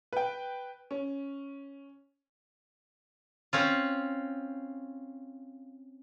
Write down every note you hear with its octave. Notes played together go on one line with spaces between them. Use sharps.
B4 G5
C#4
C4 C#4 F4